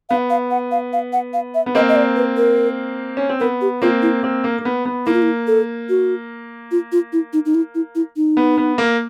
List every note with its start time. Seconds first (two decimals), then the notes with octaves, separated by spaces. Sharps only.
0.09 B3 F5
0.30 F5
0.51 F#5
0.71 F5
0.93 F5
1.13 F#5
1.34 F5
1.55 E5
1.66 B3
1.75 A#3 C4 D#5
1.89 D#5
1.96 D5
2.16 B4
2.37 A#4
3.17 C#4
3.29 C4
3.40 B3 A#4
3.61 G4
3.82 A#3 C4 F4
4.02 E4
4.23 A#3 C4
4.44 A#3
4.59 A#3
4.65 B3
4.85 B3
5.06 A#3 E4
5.14 F4
5.22 E4
5.47 A4
5.89 F#4
6.71 F4
6.92 F4
7.13 E4
7.33 D#4
7.46 D#4
7.55 E4
7.75 E4
7.95 E4
8.16 D#4
8.37 B3
8.58 B3
8.78 A#3